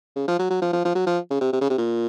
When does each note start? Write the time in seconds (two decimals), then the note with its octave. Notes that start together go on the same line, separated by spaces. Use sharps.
0.16 C#3
0.28 F3
0.39 F#3
0.50 F#3
0.62 F3
0.73 F3
0.85 F3
0.95 F#3
1.07 F3
1.30 C#3
1.41 C3
1.53 C3
1.61 C#3
1.70 C3
1.78 A#2